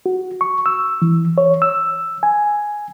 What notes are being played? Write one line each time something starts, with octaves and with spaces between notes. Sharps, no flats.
F#4
C#6
E6
E3
C#5
E6
G#5